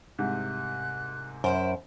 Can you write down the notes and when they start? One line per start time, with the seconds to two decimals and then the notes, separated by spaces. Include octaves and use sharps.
0.19 C2 G#2 C3 F#6
1.44 F#2 E4 F4 C5 D7